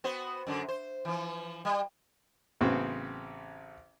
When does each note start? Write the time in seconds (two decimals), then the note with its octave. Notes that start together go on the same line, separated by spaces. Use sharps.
0.04 B3 F#4 C5
0.47 F#2 D3
0.68 C5
1.05 E3 F3
1.65 G3
2.61 A1 C#3 B3 C4 F#4